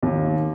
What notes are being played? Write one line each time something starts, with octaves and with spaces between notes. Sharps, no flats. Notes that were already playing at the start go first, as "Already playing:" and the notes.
D#2